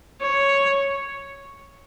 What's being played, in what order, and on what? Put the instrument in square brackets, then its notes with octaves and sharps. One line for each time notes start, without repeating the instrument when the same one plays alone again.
[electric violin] C#5